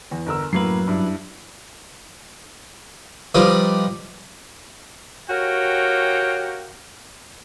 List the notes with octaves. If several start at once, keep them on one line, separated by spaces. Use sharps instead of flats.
E2
G1 A#4 E6
F#2 A2 F#3 A#3 B4 C7
G2 E4
F3 G3 D#4 B4 D5
F#4 G4 A#4 C#5 F5 G5